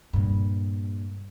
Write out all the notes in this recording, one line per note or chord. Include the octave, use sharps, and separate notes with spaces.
G2 A#2